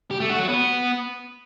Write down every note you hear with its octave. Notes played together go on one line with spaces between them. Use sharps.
G4
A3
F#4
F#3
B3